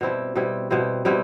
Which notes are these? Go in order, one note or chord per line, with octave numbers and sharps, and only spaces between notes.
B2 G3 C4 E4
B2 G3 C4 E4
B2 G3 C4 E4
B2 G3 C4 E4